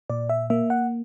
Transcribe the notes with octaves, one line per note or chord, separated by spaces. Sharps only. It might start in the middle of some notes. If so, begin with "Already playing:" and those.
A#2 D5
E5
A#3 E5
F#5